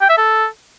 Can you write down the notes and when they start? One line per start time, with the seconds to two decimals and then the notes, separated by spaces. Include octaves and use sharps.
0.01 G5
0.09 E5
0.18 A4